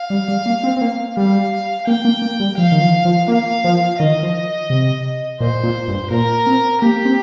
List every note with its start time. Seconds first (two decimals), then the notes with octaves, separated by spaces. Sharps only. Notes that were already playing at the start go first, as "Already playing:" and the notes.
Already playing: F5
0.10 G3
0.28 G3
0.46 A#3
0.63 C4
0.77 C4
0.81 A#3
1.16 G3 F5
1.87 A#3 G5
2.05 A#3
2.22 A#3
2.40 G3
2.57 F3 F5
2.72 D#3
2.82 F3
3.05 F3
3.28 A#3 F5
3.64 F3
3.99 D#3 D#5
4.23 F3
4.70 C3
5.40 A#2 C5
5.63 A#2
5.88 G2
6.11 A#2 A#4
6.46 C4
6.82 A#3 G4
7.05 C4